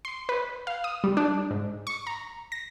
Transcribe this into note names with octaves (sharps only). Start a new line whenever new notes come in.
C6
B4
F5
D#6
G3
D4
G#2
C#6
A#5
A#6